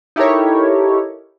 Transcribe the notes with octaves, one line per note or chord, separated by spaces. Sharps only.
D#4 E4 G4 A4 A#4 C#5